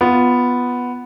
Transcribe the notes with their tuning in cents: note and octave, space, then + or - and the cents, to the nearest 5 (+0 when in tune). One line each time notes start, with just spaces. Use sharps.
B3 +0 F4 +0